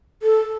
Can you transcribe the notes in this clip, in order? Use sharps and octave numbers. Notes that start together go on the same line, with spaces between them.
A4